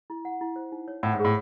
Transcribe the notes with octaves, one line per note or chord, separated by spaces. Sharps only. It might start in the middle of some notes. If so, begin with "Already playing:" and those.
E4
F#5
E4
C5
D#4
C#5
A2 F#5
G#2
G#4
A2